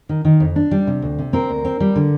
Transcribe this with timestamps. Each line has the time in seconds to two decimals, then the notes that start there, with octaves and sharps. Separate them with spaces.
0.09 D#3
0.25 D#3
0.40 F2
0.56 D4
0.71 G3
0.87 C3
1.02 D2
1.19 C3
1.33 C4 A#4
1.49 D2
1.65 C4
1.80 G3
1.96 D3